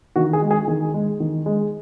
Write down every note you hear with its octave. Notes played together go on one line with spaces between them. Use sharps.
D#3 F#4
G#4
G#3
G#4
D#3 G#4
G#3
D#3
G#3